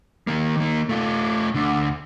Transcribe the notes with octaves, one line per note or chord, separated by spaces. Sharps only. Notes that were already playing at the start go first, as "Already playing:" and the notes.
D#3 A#3
D#3 A#3
A3 F4
D2 D3